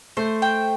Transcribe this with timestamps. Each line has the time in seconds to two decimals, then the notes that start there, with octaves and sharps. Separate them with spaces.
0.17 A3 C5
0.42 G5